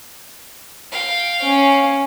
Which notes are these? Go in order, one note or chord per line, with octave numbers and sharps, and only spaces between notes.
F5 G5
C#4